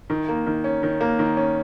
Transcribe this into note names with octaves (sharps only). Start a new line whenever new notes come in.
D#3
A#3
D#3
C#4
D#3
A#3
D#3
C#4